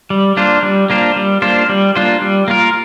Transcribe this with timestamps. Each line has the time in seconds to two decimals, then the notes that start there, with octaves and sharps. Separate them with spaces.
0.10 G3
0.37 A#3 D4 F4 C5
0.63 G3
0.90 A#3 D4 F4 C5
1.16 G3
1.42 A#3 D4 F4 C5
1.69 G3
1.95 A#3 D4 F4 C5
2.21 G3
2.48 A#3 F4 A#4